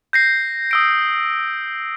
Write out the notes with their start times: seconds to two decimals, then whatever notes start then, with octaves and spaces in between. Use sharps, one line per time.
0.13 G6 A#6 C7
0.71 D#6 E6 D7